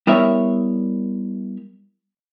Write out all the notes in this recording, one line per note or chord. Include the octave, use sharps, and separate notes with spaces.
G3 B3 E4 A#4 C#5 E5